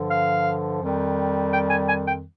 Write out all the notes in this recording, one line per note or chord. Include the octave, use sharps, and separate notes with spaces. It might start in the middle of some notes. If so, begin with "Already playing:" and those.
Already playing: G2 D3 F3
F5
F2 D#3 G3
G5
G#5
G#5
G5